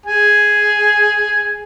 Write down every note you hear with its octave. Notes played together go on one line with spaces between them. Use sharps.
G#4 G#5